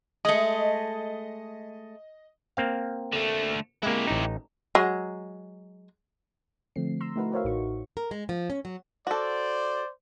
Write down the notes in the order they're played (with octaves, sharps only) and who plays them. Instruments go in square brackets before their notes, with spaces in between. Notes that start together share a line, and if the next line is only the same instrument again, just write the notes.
[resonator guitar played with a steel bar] G#3 A3 [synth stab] D#5
[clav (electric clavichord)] A#3 C4 F5
[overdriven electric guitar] D3 A3
[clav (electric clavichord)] G#3 A#3 [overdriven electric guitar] E4 G4
[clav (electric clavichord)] A1 D#4
[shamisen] F#3 G#3
[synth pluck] D3 F3 A3 C4 C7
A#5 C6 E6
A3 D#4 E4 F#4 A#4 B4
F#4 A#4 C5 C#5 E5 F5
A1 A2 D#4 F#4 C#6
[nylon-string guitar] A#4
G#3
F3
C#4
F#3
[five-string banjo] F#4 A4 [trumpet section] C5 D5